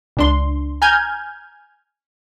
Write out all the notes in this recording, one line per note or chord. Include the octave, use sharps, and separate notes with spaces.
C#2 D4 C6
G#5 A#5 F6 G6 G#6